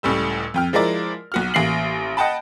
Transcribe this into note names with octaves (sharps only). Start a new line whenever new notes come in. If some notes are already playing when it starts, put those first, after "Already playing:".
C#2 A2 G3 E6
F2 G5 F6
F3 G#3 E4 A#4 D5
B1 F#4 F6
A1 A#3 C7 F#7
D#5 F#5 G5 A5 B5